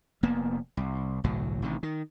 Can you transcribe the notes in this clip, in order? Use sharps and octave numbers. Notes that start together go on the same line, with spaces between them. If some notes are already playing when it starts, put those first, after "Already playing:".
F1 A#3 B3
C2
G1 C2 A2 F#3
A1 C3 D#3
D#3